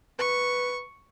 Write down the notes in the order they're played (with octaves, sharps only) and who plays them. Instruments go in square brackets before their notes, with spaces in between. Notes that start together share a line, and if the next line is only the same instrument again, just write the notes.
[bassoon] B4 [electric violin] C#6